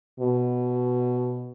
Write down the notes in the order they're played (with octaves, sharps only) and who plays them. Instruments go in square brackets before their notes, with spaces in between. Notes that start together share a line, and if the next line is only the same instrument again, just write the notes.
[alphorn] B2